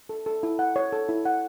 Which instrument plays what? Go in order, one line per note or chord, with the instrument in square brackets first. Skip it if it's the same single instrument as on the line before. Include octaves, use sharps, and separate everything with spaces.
[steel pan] A4
A4
E4
F#5
C#5
A4
E4
F#5